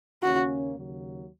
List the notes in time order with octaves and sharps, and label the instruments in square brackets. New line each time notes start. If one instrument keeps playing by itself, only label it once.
[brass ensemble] D#2 C#3 A#3 C#4 [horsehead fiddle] F#4
[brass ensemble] D#2 C#3 F#3